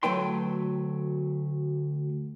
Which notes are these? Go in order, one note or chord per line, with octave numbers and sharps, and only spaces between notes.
D2 F#3 A3 B4 G5 C6